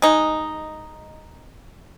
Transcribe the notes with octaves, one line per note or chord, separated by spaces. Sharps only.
G#3 D#4